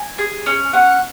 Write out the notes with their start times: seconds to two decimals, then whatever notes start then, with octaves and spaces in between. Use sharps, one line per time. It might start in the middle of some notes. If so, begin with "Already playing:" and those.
Already playing: G#5
0.18 G#4
0.46 C#4
0.73 C#4 F#5